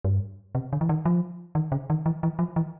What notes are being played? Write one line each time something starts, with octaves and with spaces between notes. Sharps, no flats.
G2
C3
D3
E3
D#3
F3
D#3
C#3
D#3
E3
E3
F3
E3